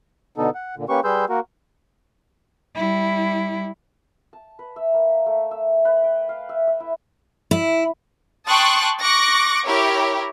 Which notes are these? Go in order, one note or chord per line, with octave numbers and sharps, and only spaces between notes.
B2 D3 B3 D#4 A4
F#5
A#2 D3
A#3 C#4 G4 B4 C#6
G3 G#4 B4 C6 E6 G6
A#3 F#4 A#4
G3 E4
A5
B4
E5
A#3
A3
E5
B4
G5
F5
E5
E5
E4
E4
G5 A5 C6 C#6 D#6 F#6
C#6 D6 F#6 A#6 C#7 D7
E4 G4 A#4 C#5